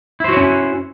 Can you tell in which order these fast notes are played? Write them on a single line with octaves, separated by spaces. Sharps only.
E4 C5 F#4 C#5 C#4